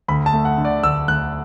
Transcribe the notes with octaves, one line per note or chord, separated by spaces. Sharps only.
D2 B5
A5
A3
F#5
D3
D5
D2 E6
D2 F#6